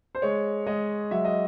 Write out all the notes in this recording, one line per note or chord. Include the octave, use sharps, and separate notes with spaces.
C5
G#3 C#5
G#3 D#5
F#3 E5
D#5